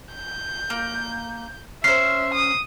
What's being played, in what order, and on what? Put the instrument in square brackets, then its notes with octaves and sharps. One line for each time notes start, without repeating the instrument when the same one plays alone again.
[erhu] G6
[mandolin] A#3
[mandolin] C#4 C5 [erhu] E5 [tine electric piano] C7
[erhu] D#6